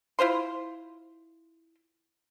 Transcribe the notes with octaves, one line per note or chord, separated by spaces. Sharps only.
E4 F4 C5 C6